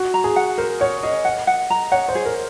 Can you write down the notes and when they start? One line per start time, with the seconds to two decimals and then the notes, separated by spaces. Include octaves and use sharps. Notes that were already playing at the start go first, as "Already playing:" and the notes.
Already playing: F#4
0.14 A#5
0.24 G#4
0.36 F#5
0.58 A#4 C5
0.80 C#5 F#5
1.03 G#4 D#5
1.25 F#5
1.47 F#5
1.70 A#5
1.92 C#5 F#5
2.08 C5
2.15 G#4
2.25 A#4